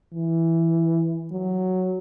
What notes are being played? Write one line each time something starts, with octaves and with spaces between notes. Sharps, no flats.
E3
F#3